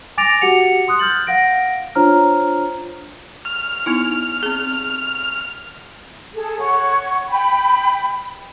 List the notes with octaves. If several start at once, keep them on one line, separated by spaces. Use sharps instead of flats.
G#5 D6 A6 A#6 D7 F7
F#4 G4 F#5 C#7 F7
C6 D#6 F#6
F6 G6 A6 F#7
F5 F#5 A#6 D7
D4 F4 C5 C#5 A#5 F6
F6
B3 D#4 E4
C4 G#4
G#4 A4
C#5 F#5 C#6
G5 B5